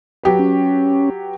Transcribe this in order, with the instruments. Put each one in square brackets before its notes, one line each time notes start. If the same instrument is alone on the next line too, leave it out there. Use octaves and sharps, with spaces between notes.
[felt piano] F#3 G4 B4
[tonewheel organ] C#4